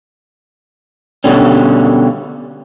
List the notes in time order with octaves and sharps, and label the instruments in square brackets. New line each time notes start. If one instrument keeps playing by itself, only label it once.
[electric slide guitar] B2 D3 G3 C#4